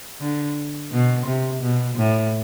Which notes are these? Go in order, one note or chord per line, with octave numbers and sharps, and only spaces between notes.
D3
B2
C3
B2
A2